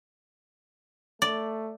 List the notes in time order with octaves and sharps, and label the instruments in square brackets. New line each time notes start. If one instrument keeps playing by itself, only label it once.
[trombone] A3 [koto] D5